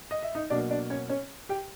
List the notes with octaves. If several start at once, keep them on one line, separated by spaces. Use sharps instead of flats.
D#5
E5
D#4 D#5
B2 F#3 A#3 D4 D5
D4 D5
C#4 C#5
C#4 C#5
G4 G5